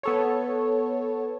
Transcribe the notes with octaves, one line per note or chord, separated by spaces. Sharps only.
B3 A4 C#5